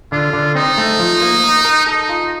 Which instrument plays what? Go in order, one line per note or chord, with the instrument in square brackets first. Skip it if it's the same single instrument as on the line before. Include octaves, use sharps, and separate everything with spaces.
[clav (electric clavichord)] D3 [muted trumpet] F4
[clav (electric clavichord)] D3
[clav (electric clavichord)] C4 [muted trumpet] D#4
[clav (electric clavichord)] A3
F3
A#3
A#4
A#4
[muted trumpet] D#4 [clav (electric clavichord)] A4
[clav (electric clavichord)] F4